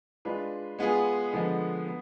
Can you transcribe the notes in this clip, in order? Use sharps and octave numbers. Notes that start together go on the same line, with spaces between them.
G#3 D4 F4 B4
G#3 B3 F4 G#4
D3 F3 G#3 B3
B3